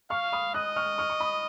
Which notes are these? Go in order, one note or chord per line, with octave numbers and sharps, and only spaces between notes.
F5 C#6 F6
B5 D#6
D#5 D#6 F#6
C#6 F6
C#6 F6
C#6
B5 D#6